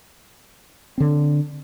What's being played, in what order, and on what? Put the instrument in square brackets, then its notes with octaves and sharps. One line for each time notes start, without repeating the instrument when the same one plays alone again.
[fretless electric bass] D3 C4